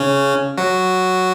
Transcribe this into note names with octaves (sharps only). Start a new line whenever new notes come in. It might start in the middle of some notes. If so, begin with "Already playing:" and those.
Already playing: C#3 C#4
F#3 F#4